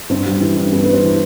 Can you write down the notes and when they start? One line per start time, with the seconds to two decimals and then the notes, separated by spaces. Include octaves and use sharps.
0.10 G2 C4
0.26 G3
0.41 E3
0.56 G2
0.72 G2 B3
0.84 B3
0.88 G3
0.93 C4
1.04 E3